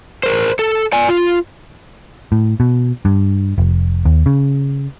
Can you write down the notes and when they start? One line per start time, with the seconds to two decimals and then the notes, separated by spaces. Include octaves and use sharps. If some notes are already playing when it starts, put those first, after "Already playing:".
0.23 A#4 C5
0.59 A4
0.92 D5 G#5
1.09 F4
2.32 A2
2.60 B2
3.05 G2
3.58 F1
4.05 D#2
4.26 C#3